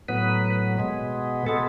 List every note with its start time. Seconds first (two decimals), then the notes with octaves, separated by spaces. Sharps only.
0.09 A2 F#3 B3 B4
0.78 B2 G#3 B3
1.47 B2 G#3 B3 A4